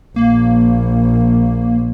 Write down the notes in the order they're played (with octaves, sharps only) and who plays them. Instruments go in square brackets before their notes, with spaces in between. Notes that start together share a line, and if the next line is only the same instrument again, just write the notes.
[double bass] A#1 [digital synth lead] A#3